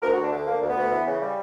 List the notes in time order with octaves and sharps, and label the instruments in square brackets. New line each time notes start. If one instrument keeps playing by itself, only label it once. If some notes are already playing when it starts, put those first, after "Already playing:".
[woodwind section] D2 A#4
F#4
D2
D4
D3
A#3
D2
B3
D2
E3
C#3
G3